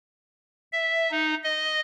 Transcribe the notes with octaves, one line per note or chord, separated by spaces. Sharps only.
E5
D#4
D#5